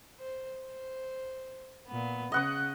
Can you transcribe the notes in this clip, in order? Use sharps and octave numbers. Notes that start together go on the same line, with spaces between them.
C5
C5
A#2 B3
C#3 D#5 F#5 D#6